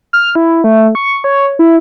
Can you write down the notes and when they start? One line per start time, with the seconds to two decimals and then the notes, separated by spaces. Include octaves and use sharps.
0.13 F6
0.35 E4
0.64 A3
0.95 C#6
1.24 C#5
1.59 E4